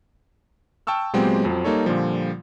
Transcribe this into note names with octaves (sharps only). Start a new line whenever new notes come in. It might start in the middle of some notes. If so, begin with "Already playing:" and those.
G5 A5 C#6 E6 F6
A#2 F#3 G#3 B3 C4 G4
F2 F3 F#3
G3 A#3 D#4 A4 C#5
A#2 D3 F3 G3